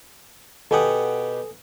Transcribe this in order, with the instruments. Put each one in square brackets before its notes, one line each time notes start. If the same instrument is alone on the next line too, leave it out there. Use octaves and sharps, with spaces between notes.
[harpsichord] B2 G4 F#5 [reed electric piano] A4 G#5 D#6